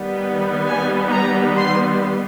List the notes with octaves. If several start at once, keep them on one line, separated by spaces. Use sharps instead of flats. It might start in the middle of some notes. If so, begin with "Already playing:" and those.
Already playing: D#3 G3 B3
G#5
A#5
C6